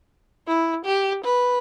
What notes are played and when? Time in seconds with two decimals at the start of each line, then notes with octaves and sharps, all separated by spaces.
0.47 E4
0.85 G4
1.24 B4